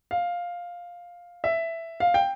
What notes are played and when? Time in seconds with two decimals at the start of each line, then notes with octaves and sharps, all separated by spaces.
0.11 F5
1.44 E5
2.00 F5
2.14 G5